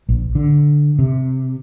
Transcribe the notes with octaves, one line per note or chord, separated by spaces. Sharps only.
A#1
D3
C3